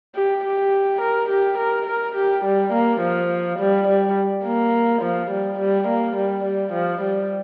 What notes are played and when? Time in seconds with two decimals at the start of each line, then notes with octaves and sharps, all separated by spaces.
0.15 G4
0.44 G4
1.01 A#4
1.29 G4
1.57 A#4
1.86 A#4
2.15 G4
2.44 G3
2.72 A#3
3.00 F3
3.59 G3
3.87 G3
4.44 A#3
5.02 F3
5.31 G3
5.58 G3
5.87 A#3
6.16 G3
6.44 G3
6.73 F3
7.01 G3